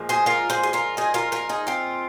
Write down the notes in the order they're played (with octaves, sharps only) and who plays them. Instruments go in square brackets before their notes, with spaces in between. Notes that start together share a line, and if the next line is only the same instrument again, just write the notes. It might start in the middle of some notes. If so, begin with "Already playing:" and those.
Already playing: [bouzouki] A#2 F3 G#3
G#4 C5
F4 A#4
G#4 C5
G#4
F4 A#4
D#4 G#4
F4 A#4
F4 A#4
D#4 G#4
C4 F4